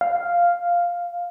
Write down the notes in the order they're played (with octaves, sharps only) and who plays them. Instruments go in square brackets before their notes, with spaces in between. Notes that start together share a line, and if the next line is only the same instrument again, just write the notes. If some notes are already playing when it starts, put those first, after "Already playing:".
[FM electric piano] F5